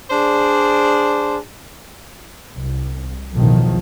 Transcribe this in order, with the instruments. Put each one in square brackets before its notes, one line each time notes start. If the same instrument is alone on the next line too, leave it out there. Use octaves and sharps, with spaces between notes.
[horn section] D4 G#4 C5 D5
[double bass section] C2
B1 E2 A2 D#3 F3